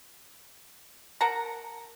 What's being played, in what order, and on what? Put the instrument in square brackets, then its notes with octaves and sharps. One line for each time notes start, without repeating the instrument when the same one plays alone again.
[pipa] A#4 F#5 A5 A#5